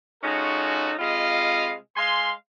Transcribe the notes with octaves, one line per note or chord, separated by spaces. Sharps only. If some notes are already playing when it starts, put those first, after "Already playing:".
G#3 C#4 D#4 F4 F#4 A4
C3 G#3 F4 D#5 F5 B5
G#3 F5 G#5 C6